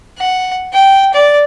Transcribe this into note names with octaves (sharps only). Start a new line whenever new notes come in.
F#5
G5
D5